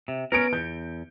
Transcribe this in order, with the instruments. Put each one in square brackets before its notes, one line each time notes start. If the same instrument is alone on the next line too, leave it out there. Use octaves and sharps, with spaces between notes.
[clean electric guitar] C3
[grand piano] B3 C#7 D7 [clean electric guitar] C#4 A#4
[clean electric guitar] E2 [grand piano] G6